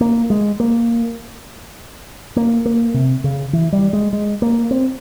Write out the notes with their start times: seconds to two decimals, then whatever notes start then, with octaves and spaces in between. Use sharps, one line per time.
0.01 A#3
0.30 G#3
0.60 A#3
2.36 A#3
2.66 A#3
2.94 C3
3.24 C#3
3.53 E3
3.73 G3
3.93 G#3
4.13 G#3
4.42 A#3
4.71 C4